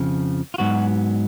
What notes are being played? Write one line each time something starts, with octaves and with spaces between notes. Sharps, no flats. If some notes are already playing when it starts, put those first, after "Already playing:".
Already playing: F2 C#3 F3
F4
G#2 F#3 B3 F#4